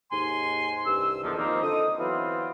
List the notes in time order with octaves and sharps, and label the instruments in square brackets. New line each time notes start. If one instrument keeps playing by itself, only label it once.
[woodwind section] D#2 G#2 G#5 C6
C2 G2 E6
E2 A#2 D3 D#3 F3
D#3 F3 A#3 C4 D#4
D3 D#5 D#6
E3 F#3 B3 C4 F4